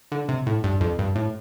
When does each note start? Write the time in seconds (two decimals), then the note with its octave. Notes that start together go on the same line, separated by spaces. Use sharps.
0.12 D3
0.29 C3
0.47 A2
0.64 G2
0.81 F2
0.99 G2
1.15 A2